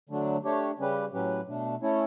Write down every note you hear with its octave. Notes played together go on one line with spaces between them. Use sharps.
D3 F#3 A3 D4
A3 D4 G4 C#5
C#3 G3 C#4 G4 B4
A2 F#3 C#4 G4 B4
B2 A3 D4
A3 C#4 E4 A4 C#5